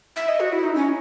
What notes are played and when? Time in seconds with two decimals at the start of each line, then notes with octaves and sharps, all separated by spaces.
0.16 E5
0.28 D#5
0.40 F#4
0.53 E4
0.63 D#4
0.75 C#4